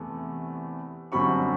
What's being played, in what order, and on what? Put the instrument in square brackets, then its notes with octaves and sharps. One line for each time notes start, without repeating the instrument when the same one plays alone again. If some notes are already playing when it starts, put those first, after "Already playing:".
Already playing: [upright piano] E2 C3 E3 A3
F#2 D3 G3 C4 B5 C#6